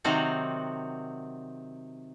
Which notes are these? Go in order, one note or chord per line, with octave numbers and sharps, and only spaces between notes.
C3 D#3 F#3 C4 D#4 F#4